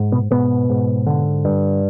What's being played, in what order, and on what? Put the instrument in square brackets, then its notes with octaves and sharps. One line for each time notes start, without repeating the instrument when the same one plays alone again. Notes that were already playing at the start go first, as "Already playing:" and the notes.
Already playing: [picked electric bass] G#2
B2 B3
G#2 B2 B3
G#2
D3
G2